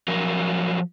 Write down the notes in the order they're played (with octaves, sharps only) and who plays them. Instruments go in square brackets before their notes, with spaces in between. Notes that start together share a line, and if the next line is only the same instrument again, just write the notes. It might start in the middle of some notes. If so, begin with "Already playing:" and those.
[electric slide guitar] F3 F#3 A#4